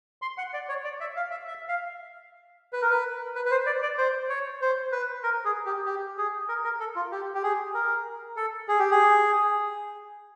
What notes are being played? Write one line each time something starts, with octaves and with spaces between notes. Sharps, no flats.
C6
F#5
D5
C#5
D5
E5
F5
E5
E5
F5
B4
A#4
B4
B4
B4
C5
D5
D5
C5
C#5
C5
B4
A#4
G#4
G4
G4
G#4
A#4
A#4
A4
F4
G4
G4
G#4
A#4
A4
G#4
G4
G#4